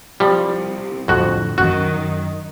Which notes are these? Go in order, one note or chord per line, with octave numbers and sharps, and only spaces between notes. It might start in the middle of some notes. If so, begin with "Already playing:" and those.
C2 C3 F3 G3
F2 A2 D3 F#4
F#2 D#3 F#4